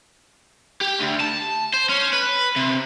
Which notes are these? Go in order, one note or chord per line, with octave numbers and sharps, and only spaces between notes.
G4
D2
A5
C5
C#4
B4
C3